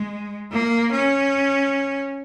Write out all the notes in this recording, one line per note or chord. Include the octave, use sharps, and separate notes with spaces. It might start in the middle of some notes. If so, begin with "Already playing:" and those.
Already playing: G#3
A#3
C#4